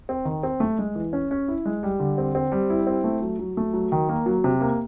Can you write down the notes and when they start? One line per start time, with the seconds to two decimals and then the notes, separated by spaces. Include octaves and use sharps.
0.09 C4
0.25 D#3
0.43 C4
0.60 A3
0.79 G#3
0.95 E3
1.13 C#4
1.31 C#4
1.48 E4
1.66 G#3
1.83 G3
2.00 D3
2.18 C4
2.35 C4
2.52 G3
2.70 E4
2.87 C4
3.04 A3
3.22 F#3
3.39 F#3
3.57 A3
3.74 F#3
3.92 D#3
4.09 A#3
4.26 F#3
4.44 C3
4.61 A#3